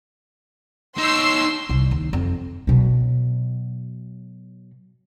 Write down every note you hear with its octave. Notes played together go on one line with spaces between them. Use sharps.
D#4 C#5 C6 E6 C7
C2
D#2
F2
B2 F#3